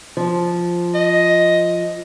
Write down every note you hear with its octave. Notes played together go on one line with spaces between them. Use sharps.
F3
D#5